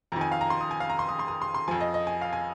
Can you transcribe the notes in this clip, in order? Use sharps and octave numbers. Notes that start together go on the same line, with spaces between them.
F2 D#3 A#5
G#5
F5
A#5
C6
D#6
G#5
F5
A#5
C6
D#6
C6
D#6
C6
C6
F2 F3 G#5
D#5
D#5
G#5
F5
G#5